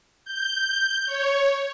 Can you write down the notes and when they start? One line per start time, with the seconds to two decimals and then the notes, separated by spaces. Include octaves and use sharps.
0.25 G6
1.06 C#5